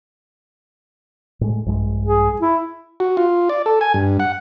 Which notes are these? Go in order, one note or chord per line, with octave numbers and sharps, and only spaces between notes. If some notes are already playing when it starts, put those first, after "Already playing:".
A2 G#3
A#1 G2 G#3
G#4
E4
F#4
F4
D5
A4
G#5
G2
F#5